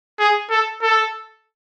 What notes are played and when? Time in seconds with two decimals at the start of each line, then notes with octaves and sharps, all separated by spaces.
0.19 G#4
0.50 A4
0.82 A4